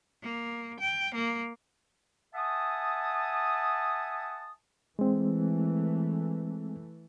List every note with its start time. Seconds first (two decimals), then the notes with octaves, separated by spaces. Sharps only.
0.23 A#3
0.80 G5
1.15 A#3
2.35 E5 F#5 G#5 A5 D#6
4.99 E3 G#3 A3 C4